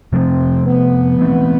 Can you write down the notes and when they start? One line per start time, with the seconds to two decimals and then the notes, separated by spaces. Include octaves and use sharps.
0.13 C3 F3 A3 C4
0.67 B3
1.19 E3 A3 C4